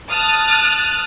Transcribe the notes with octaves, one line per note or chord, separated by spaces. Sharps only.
A5 D#6 F6 F#6 A6